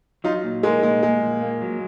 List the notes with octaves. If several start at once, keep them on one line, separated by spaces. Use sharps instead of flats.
F#3 D#4 F4
A#2
G#3 A#3 D#4
A#2 G#3
G#3 A#3
A#2
A#3
F#3